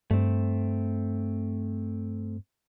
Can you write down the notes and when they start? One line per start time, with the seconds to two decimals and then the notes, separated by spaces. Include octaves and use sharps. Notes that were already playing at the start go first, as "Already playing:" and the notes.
0.11 G2 A3 C4